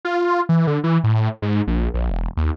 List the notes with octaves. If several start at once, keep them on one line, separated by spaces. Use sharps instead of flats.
F4
E3
D3
E3
A2
G#2
A#1
A#1
E1
D#2